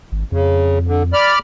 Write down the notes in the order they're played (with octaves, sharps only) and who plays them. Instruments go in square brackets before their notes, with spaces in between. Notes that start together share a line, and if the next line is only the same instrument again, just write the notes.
[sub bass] G#1
[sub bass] F2 [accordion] C#3
[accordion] D3
D5 B5 F6